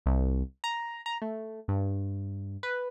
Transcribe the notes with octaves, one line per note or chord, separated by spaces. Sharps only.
C2
A#5
A#5
A3
G2
B4